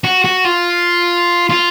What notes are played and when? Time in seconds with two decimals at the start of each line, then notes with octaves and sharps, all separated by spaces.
0.04 F#4
0.25 F#4
0.45 F4
1.49 F4